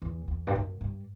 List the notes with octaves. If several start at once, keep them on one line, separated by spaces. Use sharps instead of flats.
E2
E2
G2
F#2
G2